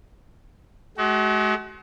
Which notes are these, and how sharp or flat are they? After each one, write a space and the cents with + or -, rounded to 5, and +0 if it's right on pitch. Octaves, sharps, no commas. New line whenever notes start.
G#3 +45 F#4 +35